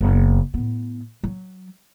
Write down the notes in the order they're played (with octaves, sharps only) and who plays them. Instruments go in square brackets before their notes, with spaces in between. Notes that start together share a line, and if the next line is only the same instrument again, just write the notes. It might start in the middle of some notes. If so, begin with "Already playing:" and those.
[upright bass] F#1 B3
A2 B3
F#3